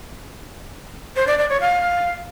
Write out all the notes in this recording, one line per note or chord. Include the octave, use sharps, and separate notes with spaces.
C5
D5
D5
C#5
F5